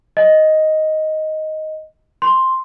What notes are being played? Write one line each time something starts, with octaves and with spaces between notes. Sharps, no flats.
D#5
C6